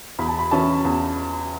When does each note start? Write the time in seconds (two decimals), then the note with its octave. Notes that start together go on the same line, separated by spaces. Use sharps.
0.19 E2 B5
0.28 A5
0.39 B5
0.51 E3 C#4 A5
0.85 E2